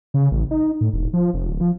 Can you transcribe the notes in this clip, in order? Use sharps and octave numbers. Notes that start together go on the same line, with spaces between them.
C#3
A1
D#4
A2
E1
F3
F1
D1
F3